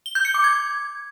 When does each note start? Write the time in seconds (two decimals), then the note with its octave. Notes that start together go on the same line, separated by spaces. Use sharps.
0.06 G7
0.15 G6
0.25 C#7
0.34 D6
0.44 G#6